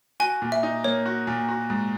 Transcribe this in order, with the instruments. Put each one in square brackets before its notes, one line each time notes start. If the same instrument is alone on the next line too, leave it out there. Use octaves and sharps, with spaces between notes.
[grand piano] F#4 [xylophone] G#5
[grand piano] A#2
[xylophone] E5
[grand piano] D#4
[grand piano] A#3 [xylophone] C#5
[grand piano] F#4
A#2
F#4
G#2